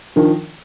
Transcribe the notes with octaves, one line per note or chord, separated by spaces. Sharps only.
D#3 F3 D4